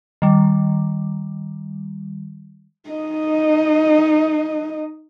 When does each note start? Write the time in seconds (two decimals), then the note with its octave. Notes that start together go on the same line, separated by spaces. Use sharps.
0.22 D#3 G3
2.89 D#4 D#5